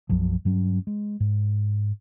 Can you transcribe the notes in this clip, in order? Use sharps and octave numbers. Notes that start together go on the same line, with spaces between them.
B1 F#2 F3 F#3
G2 F#3 C#4
G#3
G#2